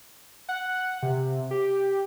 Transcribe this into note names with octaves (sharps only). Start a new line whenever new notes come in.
F#5
C3
G4